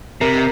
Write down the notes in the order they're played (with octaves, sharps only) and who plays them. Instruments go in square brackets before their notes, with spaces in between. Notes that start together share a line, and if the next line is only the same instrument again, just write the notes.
[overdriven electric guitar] C3 [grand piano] A#4